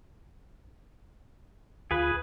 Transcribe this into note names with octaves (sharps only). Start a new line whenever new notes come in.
D2 F4 G#4 B4 B5